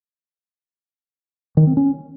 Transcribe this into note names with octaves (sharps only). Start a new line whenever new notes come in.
D#3
C4
C#4